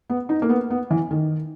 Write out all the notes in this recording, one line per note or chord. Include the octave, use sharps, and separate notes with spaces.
B3
D#4
A#3
B3
B3
E3
D#3